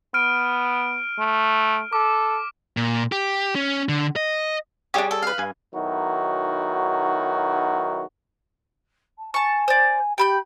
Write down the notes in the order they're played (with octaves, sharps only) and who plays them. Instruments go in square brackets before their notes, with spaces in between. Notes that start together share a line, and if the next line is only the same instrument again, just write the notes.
[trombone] B3 [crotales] F6 D7 D#7
[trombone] A3
[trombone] A4 [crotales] D6
[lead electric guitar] A#2
G4
C#4
D3
D#5
[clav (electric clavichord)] G3 G#4 C#5 [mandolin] D4 G4
[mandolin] A4
B4 F5
[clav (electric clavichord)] G2 G#5
[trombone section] B1 D#3 F#3 E4 F#4
[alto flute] A5
[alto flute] G#5 [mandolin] A5 C#6
[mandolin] C5 D5
[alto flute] G4 [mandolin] G5 B5 G6